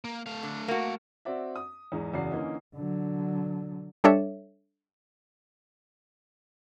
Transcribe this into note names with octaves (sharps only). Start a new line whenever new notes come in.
A#3
A3 F5
D3
A#3 F#4
C4 F#4 D5 E5
D#6
E2 G#2 G#4
F#1 E2 C#3 F#4 D5 C7
D3 E3 A#3 C#4 D#4
D3 F#3
G3 D4 A4 C#5 E5